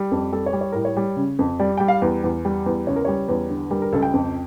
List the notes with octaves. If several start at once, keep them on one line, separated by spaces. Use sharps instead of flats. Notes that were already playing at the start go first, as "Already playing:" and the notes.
Already playing: G3
F2
G3 A4
C#5
G3
C#5
A2 A#4
C#5
G3
C#3
F2
G3 D5
G3 G5
F5
E2
E2
G3
E2
C#2 C#5
A#4
G3 C#5
E2
D3
G3 A#4
A#4
C#2 A4
G5
F2